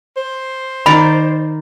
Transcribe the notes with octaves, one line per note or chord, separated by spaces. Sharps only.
C5
D#3 D5 B5 D6